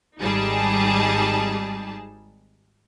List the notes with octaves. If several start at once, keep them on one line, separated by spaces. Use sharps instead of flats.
G#1 G3 D#4 G#4 A5